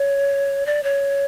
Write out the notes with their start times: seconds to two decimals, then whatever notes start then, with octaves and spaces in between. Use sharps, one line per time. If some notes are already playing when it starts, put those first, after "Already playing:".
Already playing: C#5
0.66 D5
0.83 C#5